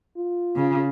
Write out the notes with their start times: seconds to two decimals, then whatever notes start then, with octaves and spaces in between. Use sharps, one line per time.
0.17 F4
0.56 C#3